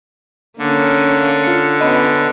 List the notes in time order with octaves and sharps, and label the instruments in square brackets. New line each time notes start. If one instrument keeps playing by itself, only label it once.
[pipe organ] D3 [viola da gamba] A#3 C#4
[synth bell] F4 C#7
[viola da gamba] B3 C#4 [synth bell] D#5 B5